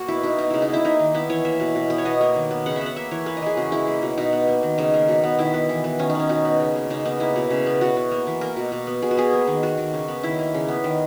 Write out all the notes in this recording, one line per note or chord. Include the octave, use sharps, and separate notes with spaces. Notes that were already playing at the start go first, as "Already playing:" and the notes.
Already playing: A#3 F#4
B2 E4
B2 D#4
A#3 D#4
C#3 E4
D#4
B3 E4
A#3 D#4
D#3
B3 E4
E3 C#5
A#3 E5
B2
B2
B3
C#5
B2 D#5
A#3
D#3
B3
C#3 F#5
B3 E5
F#5
A#3 E5
E3 C#5
A#3 B4
D#5
E3 G#4
C#3 F#4
G#3 E4
A#3
B2
B2 D#4
B3
A#3
D#3
C#3 D#4
A#3
B2
B3
D#3 E4
B3
E3
B3
D#3 C#4
D#4
B3 C#4
B2 D#4
B3
C#3
A#3
C#3 D#4
B3 D#4
A#3 E4
B2
C#3
B3
B2 F#4
B3
A#3
E3
A#3 A#4
B2
B2
B3
B2 G#4
F#4
B3 G#4
A#3
D#3
A#3 F#4
D#3
C#3
B3
D#3 E4
A#3
C#3
B3
D#3